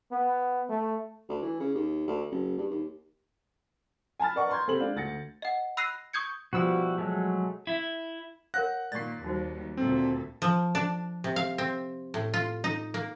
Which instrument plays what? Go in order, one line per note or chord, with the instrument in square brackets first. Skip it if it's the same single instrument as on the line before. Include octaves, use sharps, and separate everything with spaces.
[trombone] B3
A3
[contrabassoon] D2
E3
C#3
D#2
D2
F#1
G2
D#2
[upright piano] G#5 A5 B5 F6 A6
A#4 B4 D5 D#5 F#5 C#6
A#5 C6 G6 G#6
C3 C4 A4 B5 F#7
G#3 D4 F5
D2 A6 A#6 C#7
[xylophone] D#5 F#5
B5 E6 F#6 A#6 C7 D#7
C#6 D#6 G6 G#6 C#7
[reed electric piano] B2 F3 E6 [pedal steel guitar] G3 E4 F#4
[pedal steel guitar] F#3 G#3 A3
[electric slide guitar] E4
[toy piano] A#4 C#5 F5 [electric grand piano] F#5 F#6 A#6
[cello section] A#2 D#3 [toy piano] D5 C#6 [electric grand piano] A6 C7
[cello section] D#2 G3 [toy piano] D#4 F#4 C5
[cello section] D2 A#2 A4 [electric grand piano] C4
[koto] F3
D4
C3
F5
C4
A2
F4
D#4
A#3